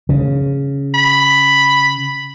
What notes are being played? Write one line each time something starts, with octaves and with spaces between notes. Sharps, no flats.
C#3
B5